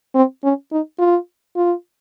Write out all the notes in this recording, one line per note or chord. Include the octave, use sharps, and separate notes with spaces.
C4
C#4
D#4
F4
F4